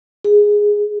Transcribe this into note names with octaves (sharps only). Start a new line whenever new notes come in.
G#4